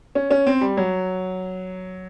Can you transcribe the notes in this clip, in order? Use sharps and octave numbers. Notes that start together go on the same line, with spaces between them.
C#4
C#4
C4
G3
F#3